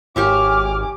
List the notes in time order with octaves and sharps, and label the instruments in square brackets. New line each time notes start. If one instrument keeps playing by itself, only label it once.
[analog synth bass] G#1 [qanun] G4 C#5 E5 [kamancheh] G#5 D6 [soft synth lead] F6